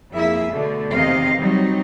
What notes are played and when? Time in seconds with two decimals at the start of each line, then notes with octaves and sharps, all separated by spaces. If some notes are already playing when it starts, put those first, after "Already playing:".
0.13 F2 A#3 E4 G#4 E5
0.51 B2 D3 A3
0.92 E2 C3 D#3 C4 D#5 F5
1.38 F#3 G3 C4 D#4